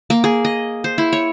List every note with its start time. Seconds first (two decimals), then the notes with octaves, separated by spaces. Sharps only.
0.10 A#3
0.24 G#4
0.45 D#5
0.84 C5
0.98 E4
1.13 C#5